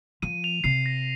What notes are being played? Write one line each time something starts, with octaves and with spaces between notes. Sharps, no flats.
F3 D#7
F7
C3 C7
A#6